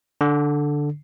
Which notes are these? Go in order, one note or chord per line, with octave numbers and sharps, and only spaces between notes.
D3